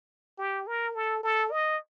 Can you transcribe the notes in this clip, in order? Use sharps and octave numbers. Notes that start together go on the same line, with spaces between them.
G4
A#4
A4
A4
D#5